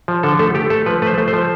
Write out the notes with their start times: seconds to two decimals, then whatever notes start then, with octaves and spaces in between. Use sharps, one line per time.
0.08 F3
0.23 D3 A4
0.39 A3 A4
0.55 A3 G4
0.70 A3 A4
0.86 F3 B4
1.02 A3 B4
1.07 C5
1.18 A3
1.28 C5
1.33 F3